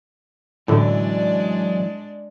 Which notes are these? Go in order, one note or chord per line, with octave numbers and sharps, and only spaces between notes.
F#2 A2 D3 E3 F#3 G#3 D4 D5